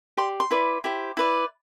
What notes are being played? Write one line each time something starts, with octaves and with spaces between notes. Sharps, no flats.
G4 D5 C6
C6
E4 B4 D5
E4 G4 C5
E4 B4 D5